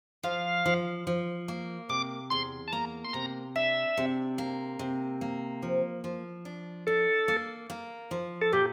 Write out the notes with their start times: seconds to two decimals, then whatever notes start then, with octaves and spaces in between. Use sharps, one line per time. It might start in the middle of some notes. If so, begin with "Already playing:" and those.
0.23 F3 F5
0.66 F3
1.07 F3
1.48 A#3
1.89 C3 D6
2.30 E2 C6
2.68 A5
2.73 A#3 A#5
3.05 C6
3.13 C3 A#5
3.56 D4 E5
3.97 C3
4.38 A#3
4.79 C3
5.21 A#3
5.62 F3
6.04 F3
6.45 D4
6.87 D4 A4
7.28 A#3
7.70 A#3
8.11 F3
8.41 A4
8.53 A#2 G4